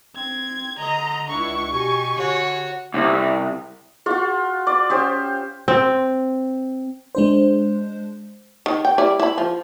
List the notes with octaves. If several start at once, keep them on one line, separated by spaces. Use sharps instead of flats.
C4 G#6
D3 D#5 A#5
C#2 D4 E4 C#6
B2 G4 G#5
D3 F#4 C#5
C2
F4 F#4 G#4
D5 D6
C#4 G4 C5 D#6
C4
G#3 D4 C5
D#3
G5
G3 E4 D5
E4 B5
F3